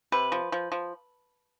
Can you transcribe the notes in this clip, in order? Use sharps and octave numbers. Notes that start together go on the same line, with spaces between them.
C3 B4
F3
F3
F3